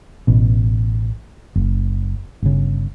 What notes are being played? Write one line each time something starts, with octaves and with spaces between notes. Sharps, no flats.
A1 B2
F#1
G1 C#3